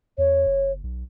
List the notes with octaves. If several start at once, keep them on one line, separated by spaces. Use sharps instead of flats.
E2 C#5
F#1
B1